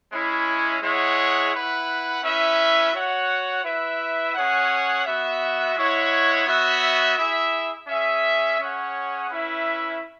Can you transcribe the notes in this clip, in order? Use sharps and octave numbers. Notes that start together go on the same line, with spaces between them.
G#3 C#4 E4 C#5
G#3 E4 G#4 C#5 F#5
E4 B4 F#5
C#4 E4 B4 E5
F#4 C#5 F#5
E4 B4 E5
C#4 G#4 C#5 F#5
B3 F#4 E5
G#3 E4 C#5 F#5
B3 F#4 C#5 E5
E4 G#4 E5
C#4 G#4 E5
C#4 G#4 C#5 F#5
C#4 E4 B4 E5